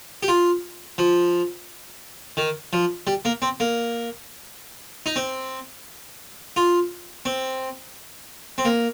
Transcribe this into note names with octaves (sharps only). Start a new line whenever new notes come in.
G4
F4
F3
D#3
F3
G3
A#3
C4
A#3
D#4
C4
F4
C4
C4
A#3